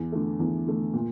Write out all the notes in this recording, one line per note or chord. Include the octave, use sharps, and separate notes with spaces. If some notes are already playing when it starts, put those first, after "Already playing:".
Already playing: E2
D3 A3
E2
D3 A3
A#2